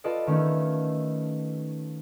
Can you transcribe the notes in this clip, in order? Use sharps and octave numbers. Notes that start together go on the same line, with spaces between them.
F4 A4 B4 D5 D#5
D#3 A3 C#4 D#4 E4